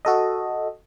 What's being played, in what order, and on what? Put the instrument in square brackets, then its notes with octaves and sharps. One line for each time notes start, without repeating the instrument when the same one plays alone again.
[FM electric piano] F#4 A4 D#5